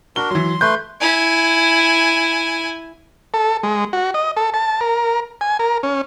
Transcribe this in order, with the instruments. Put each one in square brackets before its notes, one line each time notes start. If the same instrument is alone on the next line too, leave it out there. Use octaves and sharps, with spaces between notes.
[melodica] D4 F#4 A#4 [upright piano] G7
[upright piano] E3 F#3 [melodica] C6
[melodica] A3 B4 C6 [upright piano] G6
[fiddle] E4 G#5
[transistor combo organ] A4
G#3
F#4
D#5
A4
A5
A#4
G#5
A#4
C#4